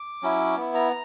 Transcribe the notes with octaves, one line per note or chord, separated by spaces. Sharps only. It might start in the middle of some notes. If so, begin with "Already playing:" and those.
Already playing: D6
F#3 C#4 E4
B3 E4
A#5